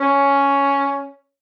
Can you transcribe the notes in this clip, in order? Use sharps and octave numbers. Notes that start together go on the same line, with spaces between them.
C#4